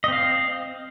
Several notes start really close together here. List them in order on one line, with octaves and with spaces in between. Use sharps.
D#5 C4 F5